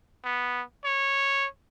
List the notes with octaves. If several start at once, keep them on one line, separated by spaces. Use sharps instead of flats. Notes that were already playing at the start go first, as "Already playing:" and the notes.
B3
C#5